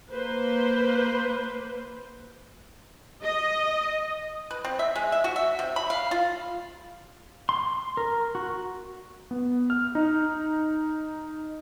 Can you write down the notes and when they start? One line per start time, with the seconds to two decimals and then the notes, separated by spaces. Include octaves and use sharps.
0.13 A#3 B4 C5
3.24 D#5
4.51 B4
4.65 C4
4.79 E5
4.96 G#3
5.12 E5
5.24 F#4
5.36 E5
5.59 C3
5.76 B5
5.90 F5
6.11 F4
7.49 C6
7.97 A#4
8.35 F#4
9.31 B3
9.70 F6
9.95 D#4